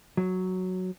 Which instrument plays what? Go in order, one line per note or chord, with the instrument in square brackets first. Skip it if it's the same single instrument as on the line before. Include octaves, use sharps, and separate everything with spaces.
[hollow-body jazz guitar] F#3